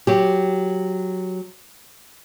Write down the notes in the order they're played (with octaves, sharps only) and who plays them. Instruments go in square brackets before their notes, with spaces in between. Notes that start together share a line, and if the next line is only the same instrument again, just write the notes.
[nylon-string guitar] F#3 G4